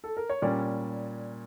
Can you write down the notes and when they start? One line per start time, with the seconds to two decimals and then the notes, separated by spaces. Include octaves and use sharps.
0.04 A4
0.17 A#4
0.30 C#5
0.42 A#2 G3 C#4 D5